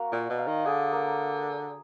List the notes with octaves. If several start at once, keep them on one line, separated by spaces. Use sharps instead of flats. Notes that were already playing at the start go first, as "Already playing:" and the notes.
Already playing: A#3 F#4
A#2 D5
B2
F5
D#3
D3 G#4
A#3